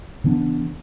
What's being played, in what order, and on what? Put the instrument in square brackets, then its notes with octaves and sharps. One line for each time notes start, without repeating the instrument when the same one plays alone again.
[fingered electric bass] C#3 E3 B3 D4